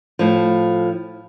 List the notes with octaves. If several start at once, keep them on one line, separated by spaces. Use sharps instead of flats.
A2 F3